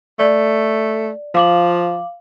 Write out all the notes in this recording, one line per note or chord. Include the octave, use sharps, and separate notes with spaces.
A3 D5
F3 F5 D6 F#7